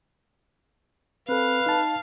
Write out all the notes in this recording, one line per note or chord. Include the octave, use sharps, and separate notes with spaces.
C4 A4 B4 F5
D#4 A5